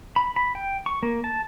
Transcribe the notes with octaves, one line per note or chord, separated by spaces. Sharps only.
B5
B5
G5
C#6
A#3
A5